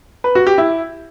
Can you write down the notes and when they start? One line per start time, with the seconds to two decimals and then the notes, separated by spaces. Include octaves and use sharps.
0.24 B4
0.35 F#4
0.47 G4
0.58 E4